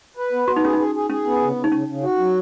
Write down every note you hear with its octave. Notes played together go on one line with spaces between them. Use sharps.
B4
B3
B3 F#4
D#4
C#4 G#4
D#4
G#4
G#4
C#4 G#4
B3
C#3
C#3
D#4
C#3 C#4
C#3
F#4
F#3